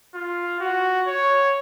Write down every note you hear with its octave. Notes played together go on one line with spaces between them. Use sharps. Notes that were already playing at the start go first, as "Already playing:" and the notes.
F4
F#4
C#5